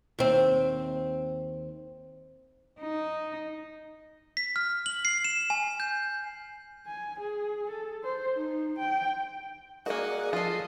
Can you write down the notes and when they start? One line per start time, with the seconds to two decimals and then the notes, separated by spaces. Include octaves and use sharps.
0.19 D#2 C4
2.80 D#4
4.37 B6
4.56 F6
4.86 F#7
5.05 C7
5.25 E7
5.50 G#5
5.80 G6
6.87 G#5
7.20 G#4
7.70 A4
8.04 C5
8.37 D#4
8.79 G5
9.86 A#3 F#4 G#4 A#4 D5 D#5 F#5 G#5
10.33 F3 F4 A4 D#5 C7